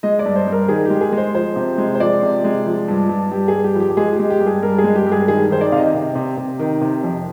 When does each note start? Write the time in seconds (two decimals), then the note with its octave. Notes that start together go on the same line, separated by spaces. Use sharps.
0.03 G#3 D#5
0.19 D5
0.26 G2
0.36 C5
0.47 G2
0.52 A#4
0.68 D#3 G#4
0.85 G#3 G4
1.01 G#4
1.12 G#3
1.17 C5
1.35 F3 C5
1.56 C3
1.78 G#3
1.95 C5
2.00 F3 D5
2.23 C3
2.44 G#3
2.66 F3
2.88 G2
3.09 G2
3.31 G2 G4
3.48 G2 G#4
3.64 G4
3.75 F3 G4
3.90 G4
3.97 G#3 G#4
4.13 G4
4.19 G#3
4.30 G4
4.41 G2
4.46 G#4
4.62 G2 A#4
4.78 G#4
4.84 G#3
4.96 G4
5.06 G2
5.12 G#4
5.28 D#3 G#4
5.50 D#3 C5
5.61 D5
5.72 C3 F5
5.77 D#5
5.94 C3
6.15 C3
6.37 C3
6.59 D#3
6.82 C3
7.04 F2